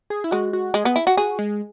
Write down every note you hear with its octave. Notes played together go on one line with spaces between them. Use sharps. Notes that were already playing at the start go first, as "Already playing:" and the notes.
G#4
E4
G#3 F#4
F#4
G#3 G#4
B3
E4
F#4
F#4 G#4
G#3